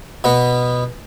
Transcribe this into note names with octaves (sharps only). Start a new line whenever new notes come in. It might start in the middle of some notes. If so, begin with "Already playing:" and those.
B2 B3